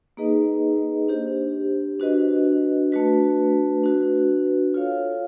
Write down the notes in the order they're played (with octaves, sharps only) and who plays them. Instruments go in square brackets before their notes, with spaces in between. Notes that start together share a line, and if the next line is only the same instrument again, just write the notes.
[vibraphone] A#3 D#4 G#4 B4 D#5
D4 G4 C5
D4 F#4 B4 D#5
A3 D4 F#4 B4
D4 F#4 B4
F4 A4 C#5 F5